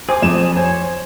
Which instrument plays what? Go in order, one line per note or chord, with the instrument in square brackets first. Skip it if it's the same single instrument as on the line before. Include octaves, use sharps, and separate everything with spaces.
[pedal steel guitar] G#4 G#5 D6 [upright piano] C5
[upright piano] F2 E7
[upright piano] C5 G#5 [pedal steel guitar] C#5